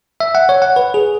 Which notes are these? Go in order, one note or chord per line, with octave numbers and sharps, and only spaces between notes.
E5
F#5
C#5
F#5
B4
G#4